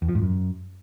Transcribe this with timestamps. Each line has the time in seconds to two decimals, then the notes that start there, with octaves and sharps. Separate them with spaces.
0.02 E2
0.09 F3
0.15 G#2
0.22 F#2